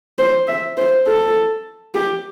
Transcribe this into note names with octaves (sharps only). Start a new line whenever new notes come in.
C5
E5
C5
A4
G4